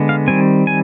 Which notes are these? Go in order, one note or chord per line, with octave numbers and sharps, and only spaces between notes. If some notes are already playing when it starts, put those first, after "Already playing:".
Already playing: D3 G#3 B3
F5
D#3 G3 C4 G#5
G#5